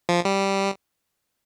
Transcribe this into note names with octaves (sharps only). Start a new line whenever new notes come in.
F3
G3